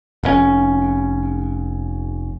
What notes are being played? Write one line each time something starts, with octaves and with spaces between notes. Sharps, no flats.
F1 A2 C#4